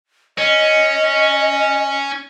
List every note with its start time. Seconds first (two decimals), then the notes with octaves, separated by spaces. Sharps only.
0.38 C#4 D#5